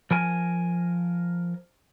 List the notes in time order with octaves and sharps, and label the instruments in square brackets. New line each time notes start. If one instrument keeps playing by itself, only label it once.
[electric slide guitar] F3 A#4 G#5